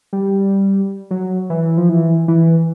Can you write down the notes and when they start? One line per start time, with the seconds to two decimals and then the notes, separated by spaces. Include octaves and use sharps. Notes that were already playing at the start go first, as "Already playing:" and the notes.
0.13 G3
1.11 F#3
1.50 E3
1.78 F3
1.89 E3
2.28 E3